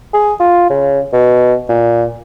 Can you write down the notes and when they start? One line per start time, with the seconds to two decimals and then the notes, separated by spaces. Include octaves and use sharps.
0.14 G#4
0.40 F4
0.70 C#3
1.13 B2
1.69 A#2